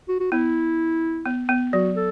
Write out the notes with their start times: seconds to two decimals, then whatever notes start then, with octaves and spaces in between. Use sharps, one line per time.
0.09 F#4
0.20 F#4
0.32 B3 E4
1.26 B3
1.49 B3
1.73 F#3 F#4
1.96 A4